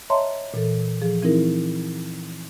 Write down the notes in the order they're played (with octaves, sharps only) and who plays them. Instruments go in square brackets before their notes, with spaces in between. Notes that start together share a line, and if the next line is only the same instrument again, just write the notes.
[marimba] C#5 D#5 E5 A5 A#5 C6
A#2 E3 A4
F3 G#4
E3 C4 D#4 E4 A#4